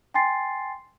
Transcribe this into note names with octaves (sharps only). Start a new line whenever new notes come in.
G5 G#5 C6 A6 C7